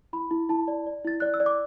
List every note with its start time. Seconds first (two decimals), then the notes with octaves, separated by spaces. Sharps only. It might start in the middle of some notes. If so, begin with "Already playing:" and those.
0.13 E4 B5
0.31 E4
0.49 E4 A5
0.68 D5
0.87 D5
1.04 E4 A6
1.20 D5 F#6
1.34 E6
1.40 D5
1.46 D6